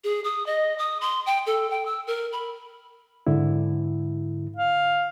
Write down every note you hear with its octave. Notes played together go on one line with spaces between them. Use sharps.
G#4
D#6
D#5
D#6
C6
G5
A4
G5
E6
A#4
B5
G#2 D3 E4
F5